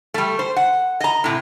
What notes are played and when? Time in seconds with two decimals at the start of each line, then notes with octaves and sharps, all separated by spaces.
0.14 G3 A3
0.39 C5
0.56 F#5
1.00 D#5 A#5
1.24 A2 C3